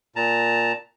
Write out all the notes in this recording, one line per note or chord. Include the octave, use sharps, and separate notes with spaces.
A#2 A5 A#5